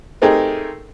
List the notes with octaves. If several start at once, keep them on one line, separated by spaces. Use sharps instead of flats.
A3 C4 D#4 G4 G#4 A#4